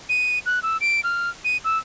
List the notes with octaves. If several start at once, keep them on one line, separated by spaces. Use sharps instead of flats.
D#7
F#6
E6
D7
F6
D#7
E6